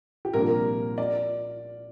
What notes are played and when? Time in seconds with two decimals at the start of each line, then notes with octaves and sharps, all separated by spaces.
0.25 G4
0.33 C2 A#2 F3 A#3 D4 A#4
0.98 D5